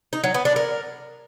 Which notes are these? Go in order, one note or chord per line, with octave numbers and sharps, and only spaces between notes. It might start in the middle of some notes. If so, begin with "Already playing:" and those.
D#4
F#3
B3
D4
A#4